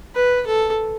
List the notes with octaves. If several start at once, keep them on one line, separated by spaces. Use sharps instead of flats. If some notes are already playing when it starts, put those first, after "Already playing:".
B4
A4